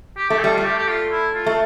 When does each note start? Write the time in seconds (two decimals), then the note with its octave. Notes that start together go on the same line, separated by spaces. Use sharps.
0.17 G4
0.30 A3 G4
0.41 G3 A4
0.53 A3 F4
0.65 G4
0.78 G4
0.88 F4
1.12 E4
1.35 F4
1.46 A3